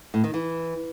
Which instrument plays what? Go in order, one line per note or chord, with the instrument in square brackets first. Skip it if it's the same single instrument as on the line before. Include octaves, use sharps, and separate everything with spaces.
[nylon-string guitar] A2
D#3
E3